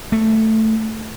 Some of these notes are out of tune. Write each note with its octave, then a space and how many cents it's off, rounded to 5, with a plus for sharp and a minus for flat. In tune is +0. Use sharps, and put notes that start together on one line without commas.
A3 +5